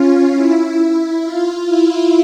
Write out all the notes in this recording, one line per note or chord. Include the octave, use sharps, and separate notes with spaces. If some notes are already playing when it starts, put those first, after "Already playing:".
Already playing: C#4 F4
E4
E4
F4
E4